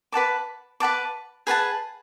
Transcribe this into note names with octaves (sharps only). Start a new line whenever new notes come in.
B4 F#5 A5 D6
B4 F#5 A5 D6
G#4 B4 F#5 A5